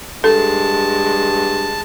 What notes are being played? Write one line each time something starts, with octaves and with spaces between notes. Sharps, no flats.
G2 G#3 A4 A5